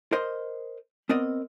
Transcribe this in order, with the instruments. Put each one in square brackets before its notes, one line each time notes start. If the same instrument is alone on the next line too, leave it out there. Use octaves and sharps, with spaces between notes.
[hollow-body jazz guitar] A#4 C5 D#5 C6
B3 C4 A#4 D5 D#5